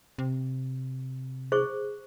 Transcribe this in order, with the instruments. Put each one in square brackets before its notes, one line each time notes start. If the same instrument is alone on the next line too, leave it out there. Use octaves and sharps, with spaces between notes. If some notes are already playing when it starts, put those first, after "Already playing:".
[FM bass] C3
[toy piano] G#4 C5 C#6